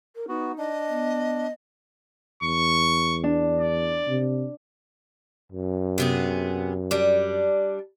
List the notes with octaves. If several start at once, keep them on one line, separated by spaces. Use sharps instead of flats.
A#4
B3 D#4 F#4
D4 D#5
B3
E2 C#6
D4
D5
C3
F#2
C3 B3 G#4
G3 D4